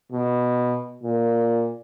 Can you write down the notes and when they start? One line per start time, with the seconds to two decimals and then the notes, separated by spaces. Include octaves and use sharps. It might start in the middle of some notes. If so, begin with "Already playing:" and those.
0.12 B2
1.03 A#2